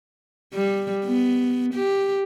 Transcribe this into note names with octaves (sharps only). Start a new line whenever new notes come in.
G3
B3
G4